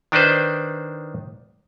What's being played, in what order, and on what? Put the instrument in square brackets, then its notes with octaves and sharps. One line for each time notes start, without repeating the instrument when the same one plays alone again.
[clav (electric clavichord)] D#3 D4 D#4 B4 C5